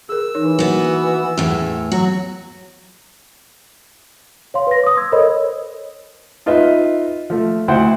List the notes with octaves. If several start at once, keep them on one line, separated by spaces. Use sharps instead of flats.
G#4 A#4 E6
E3 D#4 A#4 C#5
A#3 B3 F#4 A#4
E2 A2
F#3 B3 F#4
C#5 F5 C6
B4 A#6
D6 D#6
C6 E6 G#6
A4 A#4 C5 C#5 D#5 B5
D#4 F4 B4 D#5 E5
F3 A3
D2 E4 C5 F#5 G5 C6